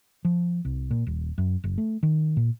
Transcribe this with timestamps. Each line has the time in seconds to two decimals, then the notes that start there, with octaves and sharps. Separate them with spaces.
0.25 F3
0.65 C2
0.91 A#2
1.07 D#1
1.38 F#2
1.64 F#1
1.78 A3
2.03 D#3
2.37 A#2